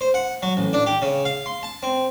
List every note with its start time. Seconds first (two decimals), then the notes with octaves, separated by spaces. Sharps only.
0.01 C5
0.14 F#5
0.42 F#3
0.57 A1
0.73 D4
0.87 G4
1.02 C#3
1.25 F5
1.46 C6
1.63 A5
1.83 C4